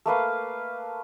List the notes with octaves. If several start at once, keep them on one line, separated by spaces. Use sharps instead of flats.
A3 A#3 B4 F5